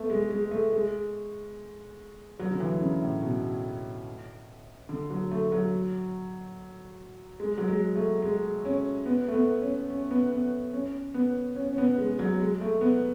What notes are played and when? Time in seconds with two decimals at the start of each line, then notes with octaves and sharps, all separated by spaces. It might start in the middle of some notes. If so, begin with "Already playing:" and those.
Already playing: A3 B3
0.10 G#3
0.30 G#3
0.51 A3
0.73 G#3
2.39 F#3
2.51 D3
2.60 E3
2.80 C#3
3.02 A2
3.22 B2
4.89 D3
5.10 F#3
5.31 A3
5.52 F#3
7.40 G#3
7.58 F#3
7.68 G#3
7.96 A3
8.22 G#3
8.65 C#4
9.06 B3
9.28 A3
9.34 B3
9.62 C#4
9.90 C#4
10.11 B3
10.32 B3
10.73 C#4
11.14 B3
11.56 C#4
11.73 C#4
11.78 B3
11.98 G#3
12.19 F#3
12.39 G#3
12.61 A3
12.81 B3